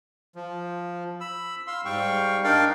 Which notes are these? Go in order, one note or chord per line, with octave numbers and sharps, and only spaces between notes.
F3
B5 E6
F5 C6 E6
G#2 G3 F5 G5 C#6
D4 D#4 A#4 D5 F5 G5